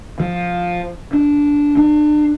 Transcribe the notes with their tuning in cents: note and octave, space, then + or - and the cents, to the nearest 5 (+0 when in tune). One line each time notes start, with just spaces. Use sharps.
F3 +10
D4 -10
D4 +35